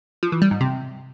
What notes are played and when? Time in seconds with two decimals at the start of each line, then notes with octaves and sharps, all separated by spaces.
0.23 F3
0.32 E3
0.42 G3
0.51 G#2
0.61 C3